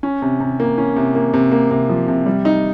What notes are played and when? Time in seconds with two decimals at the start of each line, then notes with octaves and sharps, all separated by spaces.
0.03 C#4
0.22 C3
0.40 C3
0.60 A#3
0.78 C#4
0.96 C3
1.15 A#3
1.33 C3
1.52 A#3
1.71 C3
1.89 F3
2.08 C3
2.26 G3
2.45 D#4